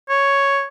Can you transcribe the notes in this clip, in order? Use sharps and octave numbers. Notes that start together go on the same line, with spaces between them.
C#5